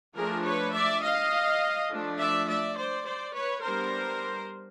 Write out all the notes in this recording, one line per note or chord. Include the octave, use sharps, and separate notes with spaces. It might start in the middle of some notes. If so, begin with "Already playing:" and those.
F3 A3 D4 G#4 A#4
B4 C#5
D5 E5
D#5 F5
F3 A3 D4
D5 E5
D5 E5
C5 D5
C5 D5
B4 C#5
G3 B3 D4 A#4 C5